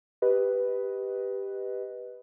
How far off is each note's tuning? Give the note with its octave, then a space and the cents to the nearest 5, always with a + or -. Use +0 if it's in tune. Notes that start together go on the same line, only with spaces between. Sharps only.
G4 +0 B4 +0 D#5 +0